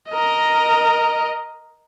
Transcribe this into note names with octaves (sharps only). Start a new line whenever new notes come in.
A#4 D#5